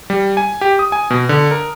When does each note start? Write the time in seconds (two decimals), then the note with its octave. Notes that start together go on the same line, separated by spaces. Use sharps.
0.10 G3
0.37 G#5
0.61 G4
0.79 D#6
0.92 G#5
1.10 B2
1.29 D3
1.51 A#4